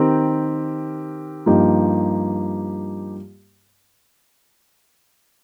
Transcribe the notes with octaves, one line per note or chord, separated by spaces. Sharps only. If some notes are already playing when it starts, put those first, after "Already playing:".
Already playing: D#3 C4 G4 A#4
G2 F3 A#3 D#4 G4